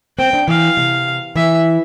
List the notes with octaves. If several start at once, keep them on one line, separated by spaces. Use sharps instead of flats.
C4 G5
D4
E3 F5
C3
E3 E5